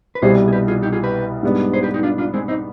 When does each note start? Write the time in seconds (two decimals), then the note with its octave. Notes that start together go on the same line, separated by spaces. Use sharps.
0.15 B4
0.22 C2 B2 G3 G#4 C5
0.48 G#4
0.53 G4 B4
0.68 F4 G#4
0.82 D#4 G4
0.93 F4 G#4
1.03 G4 B4
1.43 G#2 G3 B3 D4
1.73 G#4 C5
1.83 G4 B4
1.94 D#4 G4
2.03 D4 F4
2.18 D4 F4
2.34 G#3 C4
2.48 C4 D#4